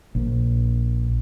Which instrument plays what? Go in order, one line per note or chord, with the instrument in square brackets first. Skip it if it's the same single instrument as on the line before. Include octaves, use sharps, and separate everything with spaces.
[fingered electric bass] A#1